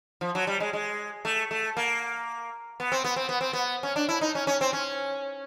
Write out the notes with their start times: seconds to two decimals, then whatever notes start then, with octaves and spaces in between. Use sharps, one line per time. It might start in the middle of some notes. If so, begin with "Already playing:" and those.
0.21 F3
0.35 F#3
0.47 G3
0.60 G#3
0.73 G#3
1.25 A3
1.51 A3
1.77 A#3
2.80 B3
2.92 C4
3.04 B3
3.16 C4
3.29 B3
3.41 C4
3.53 B3
3.83 C#4
3.96 D4
4.09 E4
4.21 D#4
4.35 C#4
4.47 C#4
4.61 C4
4.73 C#4